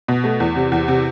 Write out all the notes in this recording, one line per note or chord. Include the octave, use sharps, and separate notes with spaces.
B2
A3
E2
C3
E2
C3